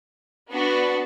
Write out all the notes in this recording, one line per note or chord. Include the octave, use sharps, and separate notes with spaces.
B3 D4 F#4 B4